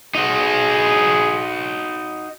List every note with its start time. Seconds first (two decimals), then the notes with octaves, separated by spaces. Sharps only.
0.15 D#4 F#4 G#4